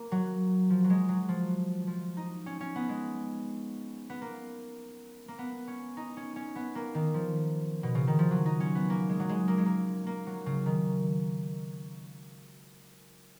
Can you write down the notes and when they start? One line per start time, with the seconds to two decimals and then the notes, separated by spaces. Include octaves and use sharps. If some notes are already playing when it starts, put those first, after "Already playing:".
Already playing: A#3
0.12 F#3
0.70 F3
0.84 F#3
0.90 G#3
1.09 F#3
1.29 F3
1.87 F3
2.17 D#4
2.46 C#4
2.60 C#4
2.75 B3
2.89 G#3
4.10 B3
4.22 A#3
5.28 A#3
5.38 B3
5.67 C#4
5.97 D#4
6.17 C#4
6.36 C#4
6.56 B3
6.75 A#3
6.94 D#3
7.14 F3
7.83 B2
7.95 C#3
8.07 D#3
8.19 F3
8.31 F#3
8.46 D#4
8.60 C#4
8.75 B3
8.90 A#3
9.09 G#3
9.20 F#3
9.29 G#3
9.48 A#3
9.58 G#3
9.66 A#3
10.07 A#3
10.27 F#3
10.46 C#3
10.66 D#3